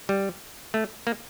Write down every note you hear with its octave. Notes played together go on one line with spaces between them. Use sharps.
G3
A3
A#3